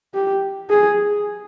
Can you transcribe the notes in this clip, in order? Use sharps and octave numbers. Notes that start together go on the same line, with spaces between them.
G4
G#4